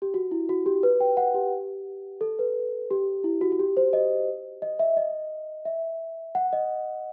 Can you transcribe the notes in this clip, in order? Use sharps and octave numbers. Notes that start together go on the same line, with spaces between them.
G4
F#4
E4
F#4
G4
B4
G5
F#5
G4
A4
B4
G4
E4
F#4
F#4
G4
C5
D#5
D#5
E5
D#5
E5
F#5
D#5